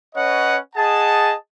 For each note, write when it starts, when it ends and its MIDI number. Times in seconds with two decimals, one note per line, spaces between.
0.15 0.57 61
0.15 0.57 71
0.15 0.57 73
0.15 0.57 75
0.15 0.57 78
0.76 1.34 68
0.76 1.34 75
0.76 1.34 78
0.76 1.34 81